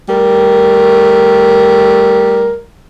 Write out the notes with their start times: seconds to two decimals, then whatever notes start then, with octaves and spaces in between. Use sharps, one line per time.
0.09 G3 A3 A#4